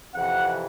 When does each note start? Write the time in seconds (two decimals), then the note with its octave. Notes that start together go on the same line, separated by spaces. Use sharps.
0.15 F2 C3 E3 F#5